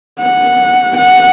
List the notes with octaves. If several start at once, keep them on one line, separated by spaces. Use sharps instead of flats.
F#5
F#5